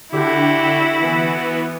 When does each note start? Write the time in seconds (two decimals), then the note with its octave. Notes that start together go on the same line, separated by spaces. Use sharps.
0.12 D3 E4 F#4 G4
0.99 E3 B3